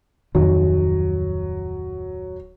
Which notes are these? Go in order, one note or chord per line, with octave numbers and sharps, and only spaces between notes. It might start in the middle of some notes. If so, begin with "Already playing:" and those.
D1 F2 D#3 F#3